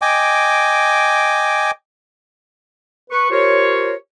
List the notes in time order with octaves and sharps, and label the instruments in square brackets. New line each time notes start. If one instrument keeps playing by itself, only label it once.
[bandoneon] D#5 G5 G#5 D6
[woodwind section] B4 C#6
F4 G4 A#4 C5 C#5